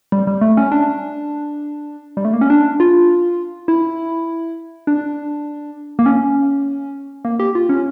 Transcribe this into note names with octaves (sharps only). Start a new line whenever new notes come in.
G3
G3
A3
C#4
D4
G3
A3
A#3
C#4
D4
F4
E4
D4
A#3
C#4
A#3
G4
F4
C#4